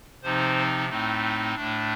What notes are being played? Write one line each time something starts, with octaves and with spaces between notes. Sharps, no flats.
C3 F3 C4 D#4 C5
A2 A3 C4 D#4
A2 A3 D4